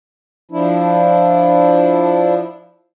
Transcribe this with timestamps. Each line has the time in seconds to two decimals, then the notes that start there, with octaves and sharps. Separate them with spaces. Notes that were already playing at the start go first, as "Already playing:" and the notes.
0.51 F3 D4 E4